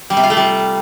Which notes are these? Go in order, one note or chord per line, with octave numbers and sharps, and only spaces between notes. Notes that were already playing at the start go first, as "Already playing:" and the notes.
G3
C3
F4
A3
G3